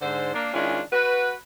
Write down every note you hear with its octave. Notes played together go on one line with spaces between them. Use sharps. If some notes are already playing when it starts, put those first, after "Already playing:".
G#2 D3 C5
A#3 D4 D5
D#3 G#3 C#4 D4 E4 F4
F#4 B4